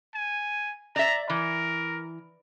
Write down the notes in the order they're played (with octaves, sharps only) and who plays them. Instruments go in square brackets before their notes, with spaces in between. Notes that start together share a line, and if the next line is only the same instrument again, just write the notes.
[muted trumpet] G#5
[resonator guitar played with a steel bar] D5 E5 [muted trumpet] A#5
[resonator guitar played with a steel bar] E3 [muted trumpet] A#4